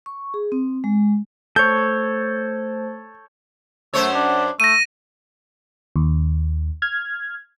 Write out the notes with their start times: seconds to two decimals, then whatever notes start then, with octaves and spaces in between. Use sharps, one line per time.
0.06 C#6
0.34 G#4
0.52 C4
0.84 G#3
1.56 A3 A4 C5 C#5 G6
3.94 F#2 A3 C5 C#5
4.14 D4
4.60 A3 A#6 D#7
5.96 D#2
6.82 F6 G#6